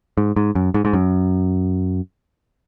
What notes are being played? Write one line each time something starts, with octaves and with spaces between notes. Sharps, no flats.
G#2
G#2
F#2
G#2
G#2
F#2